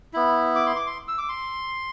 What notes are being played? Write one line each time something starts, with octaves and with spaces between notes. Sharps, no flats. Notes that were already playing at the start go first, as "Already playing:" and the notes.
B3 E4
D6
C6
D6
C6
E6
D6
C6